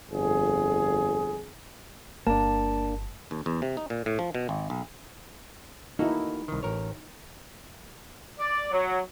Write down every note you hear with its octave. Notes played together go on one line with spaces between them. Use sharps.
G1 F2 G#4
G1 A#3 D4 A5
D#2
E2
C3
D#4
A#2
A2
F3
B2
G#1
B1
A#3 D#4 E4 F#4 A4
C2 D#3
A1 A#4 C#5
D5
F#3